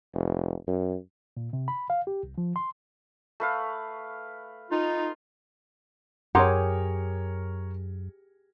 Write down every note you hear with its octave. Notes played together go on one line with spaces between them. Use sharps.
F1
F#2
A#2
C3
B5
F5
G4
C2
F3
C6
A3 B4 F5
D#4 F4
F#2 G4 G#4 A#4 C#5 F#5 A#5 C6